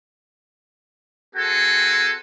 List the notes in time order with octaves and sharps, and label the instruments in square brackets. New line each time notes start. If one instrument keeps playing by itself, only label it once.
[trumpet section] C4 F#4 G#4 A4 G#5